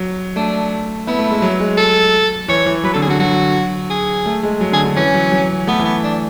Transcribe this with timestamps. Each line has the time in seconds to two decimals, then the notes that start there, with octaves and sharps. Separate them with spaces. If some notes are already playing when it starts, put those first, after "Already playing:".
Already playing: F#3
0.36 A3 D4
1.07 B3 E4
1.19 A3
1.31 G#3
1.42 F#3
1.60 G#3
1.77 A4
2.48 E3 C#5
2.66 E3
2.84 F#3 B4
2.93 D3 A4
3.02 G#4
3.08 D3 F#4
3.19 F#3 F#4
3.90 G#4
4.26 A3
4.43 G#3
4.61 F#3
4.72 D3 G#4
4.85 D3
4.96 E3 C#4
5.14 F#3
5.32 F#3
5.67 A3 B3
5.79 E3
5.85 B3
6.03 D4